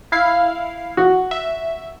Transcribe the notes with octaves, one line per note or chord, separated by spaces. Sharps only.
E4 F5 C7
F#4
E5